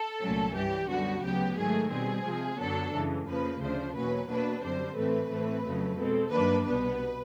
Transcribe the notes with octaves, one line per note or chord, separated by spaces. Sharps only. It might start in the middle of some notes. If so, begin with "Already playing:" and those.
Already playing: A4
C2 A#2 F#3 A3 C#4
G2 E3 G3 G4
F#2 D3 G3 B3 F#4
D2 C#3 F#3 B3 G4
G#2 D#3 F#3 A3 G#4
B2 G3 C4 G#4
C3 F3 G#3
F#2 D3 F#3 B3 D4 A4
F#2 C#3 E3 G#3
F2 C#3 F3 A#3 B4
D2 C#3 F3 A3 D4 C5
E2 B2 F#3 A#3 C#4 B4
B2 F#3 A#3 D4 B4
F#2 D3 G3 C4 C5
A2 E3 A3 C4 B4
A2 E3 A3 C4
F2 C#3 F#3 A3
B2 G#3 C4 A4
G2 D#3 F#3 A#3 D4 B4
C2 B2 G3 B3 B4